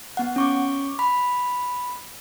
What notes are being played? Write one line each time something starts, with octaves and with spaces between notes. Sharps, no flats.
B3 F#5
C#4 C#6 D6
B5